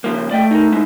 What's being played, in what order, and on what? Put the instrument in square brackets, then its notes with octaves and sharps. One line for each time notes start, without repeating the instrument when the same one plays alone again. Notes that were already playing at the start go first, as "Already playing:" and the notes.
[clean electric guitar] C#3 F3 A#3
[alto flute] A3 [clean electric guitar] D5 D#5 G5
[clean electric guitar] D#4 A#4
G#3 D#4 E4